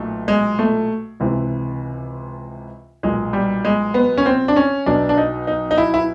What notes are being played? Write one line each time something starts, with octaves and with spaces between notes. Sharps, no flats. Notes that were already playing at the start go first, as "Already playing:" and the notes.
Already playing: B1 A#2 A3
G#3
A3
C#2 C3 E3
B1 A#2 G#3
G3
G#3
B3
C#4
C4
D4
C#4
B1 B2 D4
D4
D#4
D#4
D#4
E4
E4